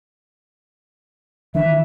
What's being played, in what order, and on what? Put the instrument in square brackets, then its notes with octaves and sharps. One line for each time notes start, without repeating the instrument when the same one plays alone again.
[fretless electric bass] D#3 E3 D4 [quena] E5